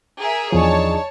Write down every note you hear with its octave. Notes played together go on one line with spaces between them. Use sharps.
G#4 A#4 E5
E2 F3 D4 D#4 G#4 C#5 A5